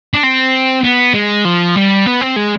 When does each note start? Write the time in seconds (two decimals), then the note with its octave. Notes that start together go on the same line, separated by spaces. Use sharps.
0.14 D4
0.23 C4
0.84 B3
1.14 G#3
1.45 F3
1.76 G3
2.06 B3
2.21 C4
2.36 G#3